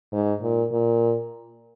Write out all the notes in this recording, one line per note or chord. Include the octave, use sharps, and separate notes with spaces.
G#2
A#2
A#2